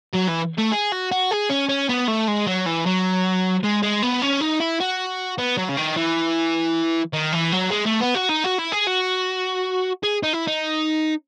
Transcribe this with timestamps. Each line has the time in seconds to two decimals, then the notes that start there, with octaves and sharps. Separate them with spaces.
0.14 F#3
0.29 E3
0.58 A3
0.72 G#4
0.92 F#4
1.12 F#4
1.31 G#4
1.50 C#4
1.69 C#4
1.89 B3
2.08 A3
2.27 G#3
2.47 F#3
2.66 E3
2.86 F#3
3.63 G#3
3.83 G#3
4.02 B3
4.22 C#4
4.41 D#4
4.60 E4
4.80 F#4
5.38 B3
5.58 F#3
5.69 C#3
5.77 D#3
5.97 E3
7.13 D#3
7.33 E3
7.52 F#3
7.71 G#3
7.86 A3
8.01 B3
8.15 F#4
8.29 D#4
8.44 F#4
8.59 E4
8.72 G#4
8.87 F#4
10.03 G#4
10.23 D#4
10.33 E4
10.47 D#4